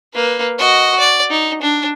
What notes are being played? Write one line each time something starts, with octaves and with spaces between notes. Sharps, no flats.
A#3 B4
F#4 D#5
D5
D#4
D4